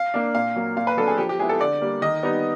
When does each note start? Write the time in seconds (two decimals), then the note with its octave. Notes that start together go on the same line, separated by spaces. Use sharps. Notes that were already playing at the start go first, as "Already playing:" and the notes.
Already playing: F5
0.14 A#3 D4
0.35 A#2 F5
0.56 F#3 A#3
0.76 A#2 F5
0.87 B4
0.97 F#3 B3 D4 A4
1.07 G#4
1.18 F3 G4
1.29 G4
1.39 G#3 B3 E4 G#4
1.49 A4
1.60 D3 D5
1.81 G3 A#3
2.01 D#3 D#5
2.23 G3 B3 D#4